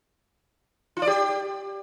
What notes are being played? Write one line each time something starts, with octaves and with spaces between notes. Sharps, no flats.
F4
D5
G4